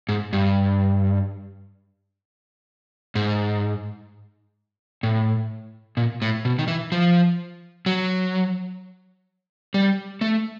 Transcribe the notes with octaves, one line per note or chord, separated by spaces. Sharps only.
G#2
G2
G#2
A2
A#2
A2
B2
D#3
E3
F3
F#3
G3
A3